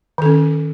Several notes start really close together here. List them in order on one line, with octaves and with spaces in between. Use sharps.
D#3 A4 C#4